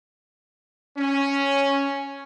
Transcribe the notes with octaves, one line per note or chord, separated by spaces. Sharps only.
C#4